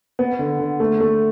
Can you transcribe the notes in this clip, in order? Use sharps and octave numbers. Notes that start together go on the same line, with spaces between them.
B3
D3
D3
A3
A3